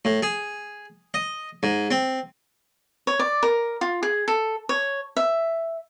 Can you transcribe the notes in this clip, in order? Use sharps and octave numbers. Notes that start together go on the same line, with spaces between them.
A2
G#4
D#5
G#2
C4
C#5
D5
A#4
F4
G#4
A4
C#5
E5